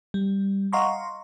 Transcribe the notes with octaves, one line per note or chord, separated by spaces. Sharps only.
G3
D#5 F5 F#5 A#5 C6 C#6